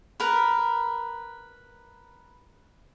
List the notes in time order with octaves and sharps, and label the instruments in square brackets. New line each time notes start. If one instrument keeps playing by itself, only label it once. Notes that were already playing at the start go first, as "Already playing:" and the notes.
[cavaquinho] A#4 B4